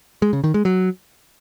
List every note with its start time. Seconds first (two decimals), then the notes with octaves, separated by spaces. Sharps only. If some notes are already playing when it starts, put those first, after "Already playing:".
0.22 G#3
0.33 C#3
0.44 D#3
0.54 G#3
0.65 F#3